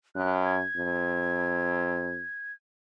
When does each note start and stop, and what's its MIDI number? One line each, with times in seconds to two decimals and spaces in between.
0.15 0.64 42
0.15 0.35 90
0.45 2.52 92
0.77 2.22 41